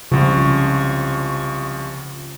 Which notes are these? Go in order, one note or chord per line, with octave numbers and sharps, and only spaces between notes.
C2 C#3 F3 C#6